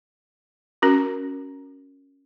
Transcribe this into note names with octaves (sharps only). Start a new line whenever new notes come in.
C#4 F#4 A#4